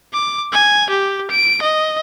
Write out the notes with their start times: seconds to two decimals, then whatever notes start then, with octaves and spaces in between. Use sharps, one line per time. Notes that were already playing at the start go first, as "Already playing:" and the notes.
0.13 D6
0.53 G#5
0.90 G4
1.31 D7
1.62 D#5